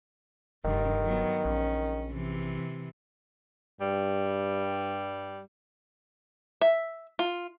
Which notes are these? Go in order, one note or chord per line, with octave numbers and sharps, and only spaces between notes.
F1 G2 D3 D#3
F#3 B3
A#1 C#4
C3 E3
G2 G3
E5
F4